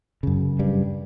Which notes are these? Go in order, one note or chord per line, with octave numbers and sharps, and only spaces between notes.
F#2 C#3
G2 G3